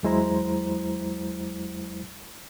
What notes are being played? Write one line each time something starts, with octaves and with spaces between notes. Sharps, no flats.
E2 F#3 G#3 E4 C5 A#5